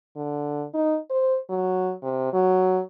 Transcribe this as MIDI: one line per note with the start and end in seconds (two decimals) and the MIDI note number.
0.16 0.66 50
0.74 0.97 63
1.10 1.37 72
1.49 1.93 54
2.03 2.30 48
2.33 2.80 54